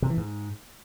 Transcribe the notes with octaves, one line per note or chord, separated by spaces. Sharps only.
C3
E3
G#2